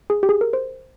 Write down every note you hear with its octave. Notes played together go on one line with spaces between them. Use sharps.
G#4
G4
G#4
A#4
C5